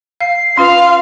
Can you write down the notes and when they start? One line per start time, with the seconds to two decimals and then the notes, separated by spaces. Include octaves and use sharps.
0.20 F5 C7
0.57 C#4 F4 B4 F5 C6